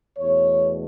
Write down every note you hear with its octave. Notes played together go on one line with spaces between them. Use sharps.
E2 B2 A3 C#5